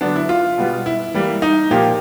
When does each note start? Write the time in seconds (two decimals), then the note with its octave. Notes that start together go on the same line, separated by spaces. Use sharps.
0.01 D3 F#3 B3 D4
0.16 E4
0.29 F4
0.58 B2 G3 B3
0.86 E4
1.14 E3 G3 A#3
1.42 D#4
1.70 A#2 F3 A#3 G4